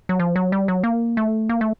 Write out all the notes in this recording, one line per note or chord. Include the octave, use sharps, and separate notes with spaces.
F#3
F3
F#3
G3
F#3
A#3
A3
A#3
A3